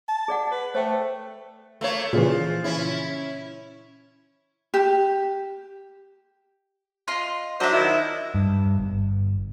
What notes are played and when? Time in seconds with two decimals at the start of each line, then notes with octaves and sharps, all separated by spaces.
0.08 A5
0.28 G#4 D5 F#5
0.51 B4
0.75 A3 C5 G5
1.81 A3 A#3 C#5
2.13 A#2 C#3 E3 F3
2.64 C#4 E4
4.74 G4
7.08 F4 D#5 C6
7.60 F#3 D4 C5 D#5 E5
7.73 D#3 E4
8.35 G2
8.78 G1